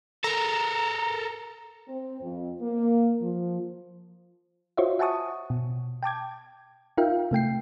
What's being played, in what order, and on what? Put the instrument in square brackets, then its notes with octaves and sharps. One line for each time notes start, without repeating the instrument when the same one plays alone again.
[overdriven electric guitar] A4 A#4 [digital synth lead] A#5
[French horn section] C4
F2
A#3
F3
[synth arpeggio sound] F4 F#4 C5 C#5 D#5 E5
E5 F#5 G#5 A5 C#6 D#6
B2
G5 A5 D6 G#6
D#4 F4 A#4 E5 F5 G5
C3 A3 G5 C7